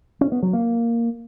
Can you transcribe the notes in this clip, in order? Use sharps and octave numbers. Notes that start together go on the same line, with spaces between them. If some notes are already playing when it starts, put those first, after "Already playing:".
C#4
B3
F#3
A#3